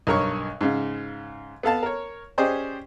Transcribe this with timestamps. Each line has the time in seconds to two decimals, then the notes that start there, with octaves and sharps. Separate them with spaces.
0.07 B1 G2 A#4 C#5 C#6
0.61 G#2 C#3
1.63 B3 A4 F5 A5
1.83 A#4 C#5
2.38 C#4 G4 G#4 C5 D5 D#5